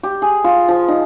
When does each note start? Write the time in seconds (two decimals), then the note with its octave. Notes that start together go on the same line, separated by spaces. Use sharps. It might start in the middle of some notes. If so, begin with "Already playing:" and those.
0.03 G4
0.22 G#4
0.44 F4
0.68 F3
0.88 D#4